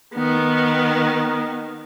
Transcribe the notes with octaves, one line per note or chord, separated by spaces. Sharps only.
D#3 B3